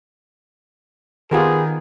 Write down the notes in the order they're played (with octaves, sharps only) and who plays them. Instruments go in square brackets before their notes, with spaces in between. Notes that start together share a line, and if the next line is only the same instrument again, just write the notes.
[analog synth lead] D#3 [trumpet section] B3 G#4 [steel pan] F4 G4 A#4